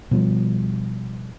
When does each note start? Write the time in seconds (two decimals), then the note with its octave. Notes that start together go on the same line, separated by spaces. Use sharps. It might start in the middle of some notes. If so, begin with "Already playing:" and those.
0.11 B2 F3 G3